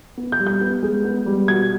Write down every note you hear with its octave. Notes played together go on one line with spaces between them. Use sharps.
B3
G6
G3
G6
B3
G#3
B3
G3
B2 G#6